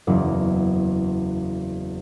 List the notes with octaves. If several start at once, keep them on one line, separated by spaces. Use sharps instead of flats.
F#1 E2